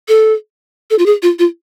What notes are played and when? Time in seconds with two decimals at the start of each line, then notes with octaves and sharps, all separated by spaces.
0.08 A4
0.90 A4
0.99 F4
1.06 G#4
1.22 F4
1.39 F4